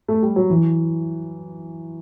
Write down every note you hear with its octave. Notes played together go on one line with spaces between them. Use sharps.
A3
G3
F#3
E3